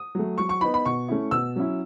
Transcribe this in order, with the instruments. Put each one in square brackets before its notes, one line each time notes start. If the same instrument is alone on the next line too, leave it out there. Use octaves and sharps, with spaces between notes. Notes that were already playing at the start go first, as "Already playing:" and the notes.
Already playing: [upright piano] D#6
F#3 A3
F#3 C#6
C#6
B3 D#4 B5
B5
B2 C#6
A3 C#4 E4
B2 E6
F#3 C#4 E4